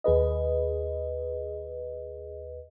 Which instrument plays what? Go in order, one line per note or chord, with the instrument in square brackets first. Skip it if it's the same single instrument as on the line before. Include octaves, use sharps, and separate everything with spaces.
[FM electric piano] D#2 G#4 B4 D#5